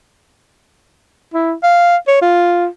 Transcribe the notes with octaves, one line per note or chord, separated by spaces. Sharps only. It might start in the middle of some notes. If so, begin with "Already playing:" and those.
E4
F5
C#5
F4